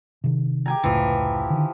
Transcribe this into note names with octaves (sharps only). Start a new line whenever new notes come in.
C3 D#3
G4 G#5 A#5
F1 C#2 A2 E3 F3
D3 D#3